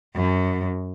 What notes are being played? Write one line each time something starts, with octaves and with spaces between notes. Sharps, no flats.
F#2